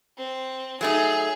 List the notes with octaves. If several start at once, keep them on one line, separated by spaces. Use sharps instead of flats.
C4
F#3 A3 D#4 G#4